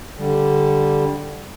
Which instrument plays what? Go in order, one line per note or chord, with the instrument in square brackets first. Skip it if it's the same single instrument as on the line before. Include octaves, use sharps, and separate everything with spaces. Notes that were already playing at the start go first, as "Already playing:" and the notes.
[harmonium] D3 G3